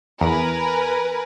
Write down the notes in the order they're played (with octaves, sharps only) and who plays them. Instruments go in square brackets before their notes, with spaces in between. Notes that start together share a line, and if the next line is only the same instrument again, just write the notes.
[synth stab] E2 [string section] A#4 B4 G#5